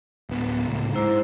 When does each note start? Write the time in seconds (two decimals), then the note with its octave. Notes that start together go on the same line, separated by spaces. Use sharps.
0.29 D1 B3
0.67 C#2 A2
0.93 G#2 E4 C5 A#5